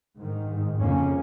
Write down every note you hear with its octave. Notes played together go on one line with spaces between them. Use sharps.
G#2 D#3
G#2
F2 C#3 A#3 C#4